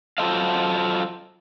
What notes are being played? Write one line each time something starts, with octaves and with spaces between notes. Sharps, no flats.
F#3 F4 A4 C5 D#5 F5